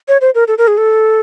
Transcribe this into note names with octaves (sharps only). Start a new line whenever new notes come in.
C#5
C5
A#4
A4
A#4
G#4
A4